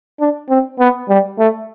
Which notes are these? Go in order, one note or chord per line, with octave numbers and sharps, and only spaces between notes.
D4
C4
B3
G3
A3